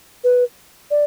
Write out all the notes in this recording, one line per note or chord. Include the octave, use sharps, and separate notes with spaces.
B4
D5